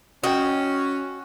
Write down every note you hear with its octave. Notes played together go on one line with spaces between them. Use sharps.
C#4 F#4 D#5 G5